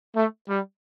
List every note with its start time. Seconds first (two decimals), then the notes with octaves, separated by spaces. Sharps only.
0.14 A3
0.48 G3